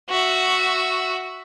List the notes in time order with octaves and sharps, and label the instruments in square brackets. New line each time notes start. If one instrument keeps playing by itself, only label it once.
[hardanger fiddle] F#4 E5